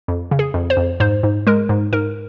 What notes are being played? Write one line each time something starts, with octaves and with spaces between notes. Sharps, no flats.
F2
C#3
G#4
F2
C5
F2
G#2 C5
G#2
G#3 A#4
G#2
G#2 A#4